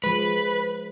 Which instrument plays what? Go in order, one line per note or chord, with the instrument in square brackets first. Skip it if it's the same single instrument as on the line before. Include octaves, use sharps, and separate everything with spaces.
[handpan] F3 G#3 [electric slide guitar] B4